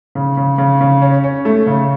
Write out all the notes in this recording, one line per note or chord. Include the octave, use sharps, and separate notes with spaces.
C#3
C#3
C#3
C#3
C#4
C#4
A3
C#3